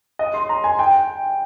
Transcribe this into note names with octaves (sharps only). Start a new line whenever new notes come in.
D#5
C6
A#5
G#5
G5